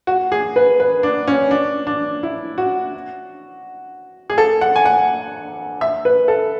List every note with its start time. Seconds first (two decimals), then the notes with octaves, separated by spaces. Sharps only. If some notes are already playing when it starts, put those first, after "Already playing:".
0.07 F#4
0.32 G#4
0.56 B4
0.80 B4
1.03 D4
1.28 C#4
1.51 D4
1.87 D4
2.23 E4
2.58 F#4
4.30 G#4
4.38 A4
4.61 F#5
4.76 G#5
4.86 F#5
5.81 E5
6.05 B4
6.28 A4